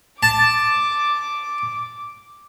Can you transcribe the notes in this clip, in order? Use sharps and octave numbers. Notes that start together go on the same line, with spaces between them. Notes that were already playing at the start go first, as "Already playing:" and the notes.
A5 D6